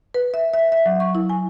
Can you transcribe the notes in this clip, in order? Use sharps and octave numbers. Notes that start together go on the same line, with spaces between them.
B4
E5
E5
E5
F#3
C#6
E4
G#5